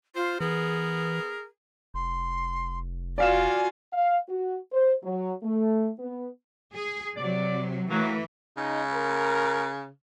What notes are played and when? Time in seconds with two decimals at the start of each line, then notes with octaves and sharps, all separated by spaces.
0.16 F4 C5
0.41 E3 B3 G#4 A#4
1.94 F1 C6
3.18 F4 F#4 D5 F5 G#5 E7
3.93 F5
4.29 F#4
4.72 C5
5.03 F#3
5.43 A3
5.99 B3
6.74 G#4
7.16 C3 F#3 D5
7.90 E3 F#3 A3 A#3
8.57 C#3 D#4
8.93 A#4